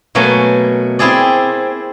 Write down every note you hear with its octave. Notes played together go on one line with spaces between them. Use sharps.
B2 F#3 A3 A#3 G#5
C4 E4 G4 G#4 D5